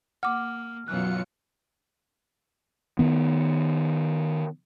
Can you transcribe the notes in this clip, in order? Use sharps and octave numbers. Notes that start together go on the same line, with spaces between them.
A#3 F#5 D6 F6
F#2 B2 E3 F#3 F4 F#6 C#7
D#3 B3